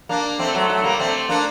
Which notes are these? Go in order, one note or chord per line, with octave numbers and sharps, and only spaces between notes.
A#3 D4
A3 C4
F#3 A3
F#3 A3
G3 A#3
A3 C4
A#3 D4